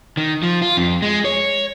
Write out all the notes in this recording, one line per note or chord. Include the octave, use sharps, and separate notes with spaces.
D#3
F3
F4
F2
G#3
C#5